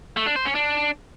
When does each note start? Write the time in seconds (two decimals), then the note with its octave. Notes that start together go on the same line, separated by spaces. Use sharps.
0.17 A3
0.26 D4
0.36 C5
0.45 C#4
0.55 D4